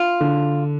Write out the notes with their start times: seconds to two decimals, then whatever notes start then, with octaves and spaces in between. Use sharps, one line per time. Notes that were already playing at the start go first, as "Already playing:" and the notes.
Already playing: F4
0.20 D3